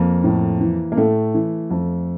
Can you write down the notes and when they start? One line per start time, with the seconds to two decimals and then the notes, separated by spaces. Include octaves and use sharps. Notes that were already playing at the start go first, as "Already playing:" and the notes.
Already playing: F2 A#3
0.24 A2
0.61 E3
0.92 A#3
0.97 A2 A3
1.34 E3
1.71 F2